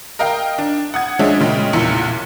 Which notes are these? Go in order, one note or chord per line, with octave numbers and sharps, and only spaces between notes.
A#4 D#5 F5 G5 F6
D4
F#5 D#6 G#6
F3 G#3 C#4 D4 G#4 E5
A#2 C#3 G#3 G5
B1 E2 A#2 E4 C#7